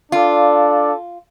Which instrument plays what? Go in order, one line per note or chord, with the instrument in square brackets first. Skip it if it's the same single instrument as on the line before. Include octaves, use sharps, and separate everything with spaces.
[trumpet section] D4 A4 D5 F5 [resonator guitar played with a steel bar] F4